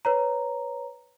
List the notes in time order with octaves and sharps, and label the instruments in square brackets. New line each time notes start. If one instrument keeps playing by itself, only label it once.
[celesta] B4 C#5 A#5